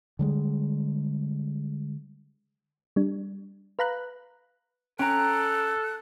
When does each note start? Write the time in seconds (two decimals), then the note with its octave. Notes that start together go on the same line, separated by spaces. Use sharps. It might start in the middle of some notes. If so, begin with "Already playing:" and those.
0.19 D3 G3 G#3
2.96 G3 D4
3.79 B4 F5 A#5 B5 F#6
4.99 C#4 A4 G5 A#5 F#6